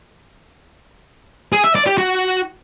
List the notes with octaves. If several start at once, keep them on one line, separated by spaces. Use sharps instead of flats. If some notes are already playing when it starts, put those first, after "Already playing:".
G#4
E5
D5
G4
F#4